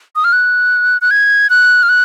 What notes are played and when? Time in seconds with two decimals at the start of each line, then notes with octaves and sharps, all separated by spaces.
0.16 D#6
0.24 F6
0.33 F#6
1.01 F#6
1.11 G#6
1.50 F#6
1.83 F6
1.89 F#6